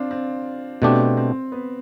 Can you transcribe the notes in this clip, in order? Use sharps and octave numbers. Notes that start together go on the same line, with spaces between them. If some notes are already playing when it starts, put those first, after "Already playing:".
Already playing: C4 D4 F4
C4
B2 A3 C4 D4 G4
C4
B3